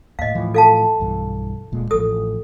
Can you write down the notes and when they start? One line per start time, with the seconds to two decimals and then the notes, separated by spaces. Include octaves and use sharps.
0.19 D#2 A2 D#5 F5
0.35 A2 E3 F3
0.54 A4 F5 A5
1.00 B1 G2 E3
1.72 D1 A#2 G#3
1.91 A1 F3 A4 D#6